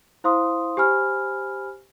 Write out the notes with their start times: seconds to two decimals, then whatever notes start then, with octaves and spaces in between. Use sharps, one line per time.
0.24 E4 C5 F5 C6 D#6
0.77 G4 C5 G#5 B5 F6